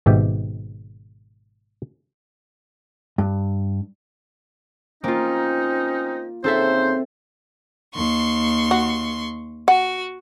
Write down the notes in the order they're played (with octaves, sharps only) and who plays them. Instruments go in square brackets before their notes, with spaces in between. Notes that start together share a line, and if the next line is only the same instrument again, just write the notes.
[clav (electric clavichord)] G#1 G#2 B2 G4 E5 G5
[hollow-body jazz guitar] G2
[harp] A#3 F4 [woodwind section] C4 C#4 D#4
[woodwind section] C#3 D#4 C5 [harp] C4 A4 E5
[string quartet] D#2 C6 C#6
[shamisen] F#4
[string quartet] F#4 [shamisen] F#5